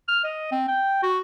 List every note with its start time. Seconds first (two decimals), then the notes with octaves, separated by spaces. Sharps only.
0.08 F6
0.24 D#5
0.52 C4
0.68 G5
1.03 F#4